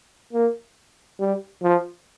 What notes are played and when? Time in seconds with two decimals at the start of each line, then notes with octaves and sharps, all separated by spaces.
0.33 A#3
1.20 G3
1.63 F3